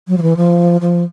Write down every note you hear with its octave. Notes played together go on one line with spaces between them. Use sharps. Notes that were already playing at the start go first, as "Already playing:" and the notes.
F#3
F3
E3
F3
F3